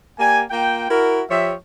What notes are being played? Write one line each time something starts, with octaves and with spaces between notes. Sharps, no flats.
A#3 G4 D5 G#5
A#3 F4 G5
E4 F#4 A#4
F3 G4 C#5 E5